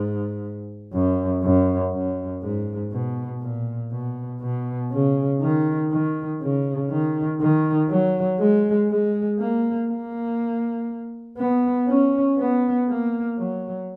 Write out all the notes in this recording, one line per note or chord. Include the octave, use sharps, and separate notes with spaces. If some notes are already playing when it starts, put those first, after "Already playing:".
Already playing: G#2
F#2
F#2
F#2
G#2
B2
A#2
B2
B2
C#3
D#3
D#3
C#3
D#3
D#3
F#3
G#3
G#3
A#3
A#3
B3
C#4
B3
A#3
F#3